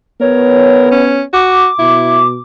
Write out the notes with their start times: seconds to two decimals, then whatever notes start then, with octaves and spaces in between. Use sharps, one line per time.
0.21 B3 A#4 C#5
0.92 C#4
1.33 F#4 D6
1.79 B2 E4